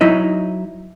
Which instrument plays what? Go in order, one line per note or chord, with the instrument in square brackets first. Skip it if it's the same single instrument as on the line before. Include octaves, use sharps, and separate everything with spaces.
[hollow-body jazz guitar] F#3 D#4 E4 D#5